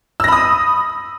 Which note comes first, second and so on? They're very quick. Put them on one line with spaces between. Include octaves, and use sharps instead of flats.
E6 A#6 B5 D#6